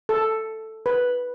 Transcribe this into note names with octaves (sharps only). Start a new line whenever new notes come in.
A4
B4